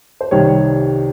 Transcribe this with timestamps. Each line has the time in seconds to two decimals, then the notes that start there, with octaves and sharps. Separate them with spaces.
0.21 C5
0.31 C2 C3 D#3 G3 C#5